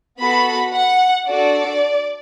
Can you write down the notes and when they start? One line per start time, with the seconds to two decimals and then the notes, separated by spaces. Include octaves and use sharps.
0.19 B3 F#4 A4 B5
0.73 F#5
1.27 D4 F#4 A4 D5